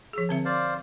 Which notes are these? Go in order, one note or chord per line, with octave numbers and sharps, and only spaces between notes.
F3 G#4
D3 C4 E5
C5 D5 F5